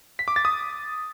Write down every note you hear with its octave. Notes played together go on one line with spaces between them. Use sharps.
B6
D6
A6
D#6